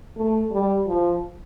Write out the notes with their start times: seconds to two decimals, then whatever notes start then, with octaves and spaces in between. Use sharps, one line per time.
0.17 A3
0.51 G3
0.87 F3